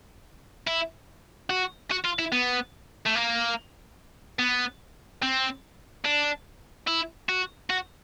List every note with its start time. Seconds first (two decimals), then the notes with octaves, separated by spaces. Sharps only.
0.67 E4
1.50 F#4
1.91 F#4
2.05 F4
2.19 E4
2.32 B3
3.06 A3
3.15 A#3
4.39 B3
5.22 C4
6.05 D4
6.88 E4
7.29 F#4
7.70 F#4